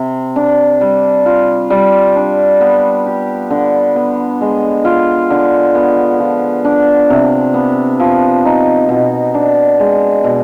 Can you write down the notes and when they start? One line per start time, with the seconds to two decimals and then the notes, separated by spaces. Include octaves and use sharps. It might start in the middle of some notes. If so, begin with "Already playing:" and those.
Already playing: C3
0.36 D4
0.81 G3
1.26 F4
1.70 G3
2.16 D4
2.61 B3
3.06 G4
3.50 D3
3.96 B3
4.41 G#3
4.85 F4
5.30 D3
5.75 B3
6.20 F3
6.65 D4
7.10 C3
7.54 B3
8.00 F3
8.45 D#4
8.89 B2
9.34 D4
9.79 G#3
10.24 B2